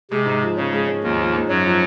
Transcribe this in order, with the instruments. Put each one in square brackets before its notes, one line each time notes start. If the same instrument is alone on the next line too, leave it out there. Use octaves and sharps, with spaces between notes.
[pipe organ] C3 [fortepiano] G#3
[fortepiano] G#2
F3
[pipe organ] C#3 [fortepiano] C#4
[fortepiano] G#3
C#4
[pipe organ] D#2 D#3 [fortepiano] F3
[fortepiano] F3
G#2
[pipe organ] F#2 F#3 [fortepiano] C#4
[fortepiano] F3